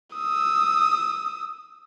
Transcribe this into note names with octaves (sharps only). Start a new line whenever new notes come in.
D#6 E6